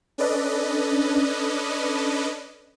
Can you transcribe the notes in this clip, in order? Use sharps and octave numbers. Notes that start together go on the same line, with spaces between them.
C#4 D4 A4 B4 D5 D#5